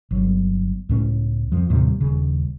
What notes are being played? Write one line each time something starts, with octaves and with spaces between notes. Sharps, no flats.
G1 F#3
C#2 A2 C#4
F2 F3
D#2 A2 C3 G3
D#1 C#3